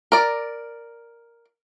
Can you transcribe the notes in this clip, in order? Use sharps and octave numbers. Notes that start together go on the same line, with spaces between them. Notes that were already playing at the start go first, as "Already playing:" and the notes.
A#4 D5